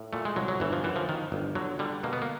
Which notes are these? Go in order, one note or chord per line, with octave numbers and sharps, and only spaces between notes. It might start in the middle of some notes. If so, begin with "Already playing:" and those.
Already playing: A2
A#2 A3
G#3
C2 F#3
F#3
G1 E3
F3
F#2 E3
F3
D#3
G1
D3 F#3
D3 G3
B2 A#3
B3
A#3